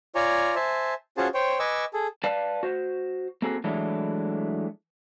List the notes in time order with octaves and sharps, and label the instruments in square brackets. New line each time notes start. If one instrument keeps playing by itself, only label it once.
[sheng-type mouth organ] F4 C#5 D5 G#5 A#5
C5 E5 G#5 A5
C#4 F4 F#4 G#4 C5 A5
C5 C#5 G5
B4 D#5 G#5 C#6 D6 E6
G#4 A4
[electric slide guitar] B4 D5 F5 A5
F#4 C5
A#3 C4 F#4 G#4 A4
E3 F#3 G#3 A3 D4 E4